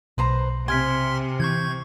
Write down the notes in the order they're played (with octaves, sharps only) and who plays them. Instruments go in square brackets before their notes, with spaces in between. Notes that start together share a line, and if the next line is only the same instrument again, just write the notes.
[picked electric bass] B1 [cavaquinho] B4 C5 A#5
[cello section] C3 [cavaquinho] G#5 [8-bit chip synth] C6 F6 B6
[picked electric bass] E3 [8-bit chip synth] C#6 G6 G#6